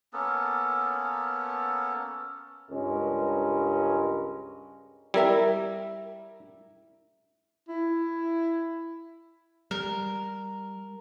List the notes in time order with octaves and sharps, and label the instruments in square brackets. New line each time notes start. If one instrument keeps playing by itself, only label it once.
[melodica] A#3 B3 C#4 A4
[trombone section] C#2 G2 G#3 C#4 A#4
[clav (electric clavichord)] G3 [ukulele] E4 A#4 E5
[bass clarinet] E4
[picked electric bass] G3 [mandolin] A#4